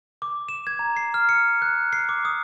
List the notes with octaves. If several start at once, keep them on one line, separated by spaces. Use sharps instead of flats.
D6
E7
G#6
A#5
C7
F6
C#7
F#6
C7
D6
D#6